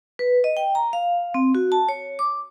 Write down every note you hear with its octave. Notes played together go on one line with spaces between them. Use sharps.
B4
D#5
G5
A#5
F5
C4
F#4
A5
C#5
D6